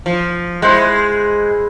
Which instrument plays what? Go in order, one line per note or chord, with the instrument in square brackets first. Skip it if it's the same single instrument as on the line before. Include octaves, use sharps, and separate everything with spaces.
[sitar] F3
[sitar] G#3 [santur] E4 C5 F#5